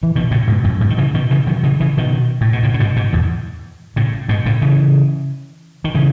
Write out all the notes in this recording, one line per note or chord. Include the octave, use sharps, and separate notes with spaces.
E3
B2 D#3
A2 C#3
G#2 B2
F#2 A2
G#2 B2
D#3
C#3 E3
B2 D#3
C#3 E3
D#3 F#3
C#3 E3
C#3 E3
B2 D#3
A2
B2
A2 C#3
C#3
G#2 B2
G#2 B2
E2 G#2
A2 C#3
G#2 B2
A2 C#3
C#3 E3
D#3
C#3 E3